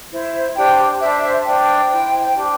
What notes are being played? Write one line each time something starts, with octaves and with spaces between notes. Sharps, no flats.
E4 C5
D4 G4 C5 G5
D4 C5 E5
D4 C5 G5
E4 C5
D4 G4 C5